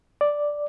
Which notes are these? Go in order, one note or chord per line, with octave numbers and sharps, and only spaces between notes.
D5